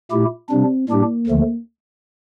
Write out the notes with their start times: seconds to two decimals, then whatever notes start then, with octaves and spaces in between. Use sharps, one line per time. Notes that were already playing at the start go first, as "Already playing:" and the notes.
0.11 A#2 A3 E4 G4
0.49 C3 G3 C4 D4
0.89 A2 G3 A#3 D4 G4
1.27 D2 D3 F3 A3